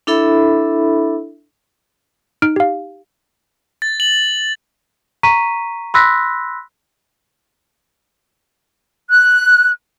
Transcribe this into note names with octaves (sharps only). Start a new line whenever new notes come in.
D4 E4 A4 E5 B5
D#4 F6 D7
G4 F5
A6
F#7
A#5 C#6 B6 D#7
B5 C6 E6 F#6 A#6 B6
F#6